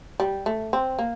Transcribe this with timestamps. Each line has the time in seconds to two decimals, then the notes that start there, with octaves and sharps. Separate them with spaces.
0.20 G3
0.46 A3
0.73 C4
0.99 A#3